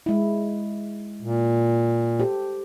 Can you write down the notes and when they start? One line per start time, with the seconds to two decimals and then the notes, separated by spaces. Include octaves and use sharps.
0.06 G#3 E4
1.22 A#2
2.20 G4 A4 C5